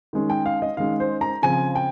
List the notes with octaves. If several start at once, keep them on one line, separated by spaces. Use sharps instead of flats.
D#3 G#3 C#4
G5
F5
D#5
D#3 G#3 C#4 F5
C5
A#5
C#3 F3 C4 G#5
G5